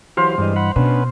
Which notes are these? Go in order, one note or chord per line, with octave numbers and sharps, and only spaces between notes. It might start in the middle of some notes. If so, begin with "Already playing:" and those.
E3 F#3 G4 C5 F5 C6
G2 E3 G3 G#3 D#5
F#5 B5
B2 B3 C#4 D4 B4